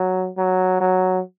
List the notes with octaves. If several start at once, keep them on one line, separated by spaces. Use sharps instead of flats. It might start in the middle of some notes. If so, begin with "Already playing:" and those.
Already playing: F#3
F#3
F#3